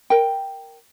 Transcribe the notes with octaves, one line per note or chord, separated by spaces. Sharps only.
A#4 G5